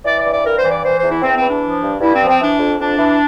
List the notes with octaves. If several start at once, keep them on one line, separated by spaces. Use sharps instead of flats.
E3 D5
D5
G2
D5
G2 A#4
C5
E3
D5
E3 C5
C5
E2
E4
E2 C4
C4
E3
D4
F3
G2
G2 E4
C4
F3
C4
E3 D4
F2
F2 D4
E3